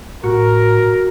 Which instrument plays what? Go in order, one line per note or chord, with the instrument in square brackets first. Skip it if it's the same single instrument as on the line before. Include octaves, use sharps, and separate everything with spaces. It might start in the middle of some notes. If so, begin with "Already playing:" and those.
[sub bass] A2 [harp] F#4 [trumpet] A#4